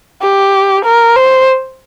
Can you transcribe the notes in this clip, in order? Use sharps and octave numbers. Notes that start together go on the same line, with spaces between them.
G4
A#4
C5